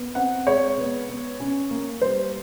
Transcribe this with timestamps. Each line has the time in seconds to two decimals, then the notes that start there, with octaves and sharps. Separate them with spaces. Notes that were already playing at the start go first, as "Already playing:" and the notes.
Already playing: B3
0.15 C4 F#5
0.47 G#3 C#5
0.77 B3
1.09 B3
1.40 C#4
1.71 A#3
2.01 G3 C5